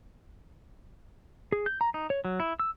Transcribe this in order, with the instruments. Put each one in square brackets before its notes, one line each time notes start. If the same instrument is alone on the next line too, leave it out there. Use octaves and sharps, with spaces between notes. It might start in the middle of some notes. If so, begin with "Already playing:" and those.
[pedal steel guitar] G#4
G6
A#5
D#4
C#5
F#3
E4
E6